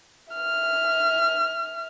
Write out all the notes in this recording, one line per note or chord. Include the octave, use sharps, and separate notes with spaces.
E5 F6